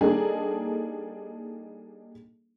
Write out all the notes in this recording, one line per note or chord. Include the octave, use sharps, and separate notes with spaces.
G3 A#3 D4 D#4 G#4 A4